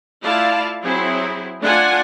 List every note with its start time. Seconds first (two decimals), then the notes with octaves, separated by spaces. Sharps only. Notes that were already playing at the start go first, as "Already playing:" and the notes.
0.23 A3 E4 F4 D5 F5 A5
0.83 F#3 C4 E4 G#4
1.61 A3 D4 F4 F#5 G#5